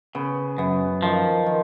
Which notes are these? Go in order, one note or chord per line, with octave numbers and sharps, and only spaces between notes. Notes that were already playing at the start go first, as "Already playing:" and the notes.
C#3 B3
F#2 B3
D#3 F3
D#3